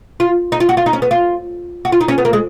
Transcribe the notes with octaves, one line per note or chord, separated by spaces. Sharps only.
F4
D#4
F4
F#4
F4
D#4
C#4
B3
F4
F#4
F4
D#4
C#4
B3
A#3
G#3